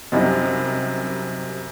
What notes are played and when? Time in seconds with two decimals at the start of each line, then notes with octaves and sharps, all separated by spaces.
0.12 F#2 C3 G3 D#4